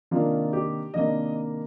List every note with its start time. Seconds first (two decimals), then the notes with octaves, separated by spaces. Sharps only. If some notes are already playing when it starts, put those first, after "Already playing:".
0.11 C3 D#3 A#3 D4 F4
0.53 G4
0.94 C3 D#3 A#3 D4 D#5